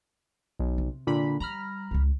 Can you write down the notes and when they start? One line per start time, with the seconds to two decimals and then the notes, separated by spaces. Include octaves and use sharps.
0.59 B1
0.78 C3
1.07 A#2 D3 B5
1.40 G3 A#5 B5 F6
1.91 D1 C#2